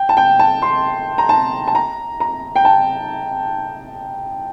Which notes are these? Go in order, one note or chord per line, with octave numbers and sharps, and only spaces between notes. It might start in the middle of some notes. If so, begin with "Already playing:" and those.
Already playing: G5
A5
G5
A5
C6
A#5
A5
A5
A#5
A#5
G5
A5